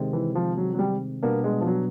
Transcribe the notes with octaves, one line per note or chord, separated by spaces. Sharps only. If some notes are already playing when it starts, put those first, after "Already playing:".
Already playing: C3 D#3 G#3 C4
E3
F3
F#3
F#3
G3
B2 G3 A#3 B3 D4
G#3
F3
F#3